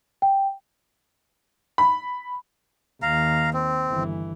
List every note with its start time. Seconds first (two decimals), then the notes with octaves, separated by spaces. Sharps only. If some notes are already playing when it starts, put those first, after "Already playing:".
0.22 G5
1.78 B5
3.02 D#2 F5 A#5
3.53 C4
3.88 G1 E3